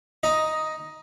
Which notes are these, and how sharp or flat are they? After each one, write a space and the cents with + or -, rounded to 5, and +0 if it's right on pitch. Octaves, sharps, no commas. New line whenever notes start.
D#4 +10 D#5 +5